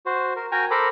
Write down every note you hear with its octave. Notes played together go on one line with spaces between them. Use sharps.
F#4 C5
A#4
F#4 A#4 G5 G#5 A#5 C#6
A4 A#4 C5 A#5 B5 D6